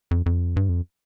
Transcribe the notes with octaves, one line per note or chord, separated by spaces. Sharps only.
F2
F2
G2
F2